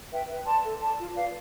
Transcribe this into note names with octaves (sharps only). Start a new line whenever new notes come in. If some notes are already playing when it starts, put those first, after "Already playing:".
B4 E5 G5
B4
D5 A5 C6
A4
D5 A5
F4
B4 D5 F5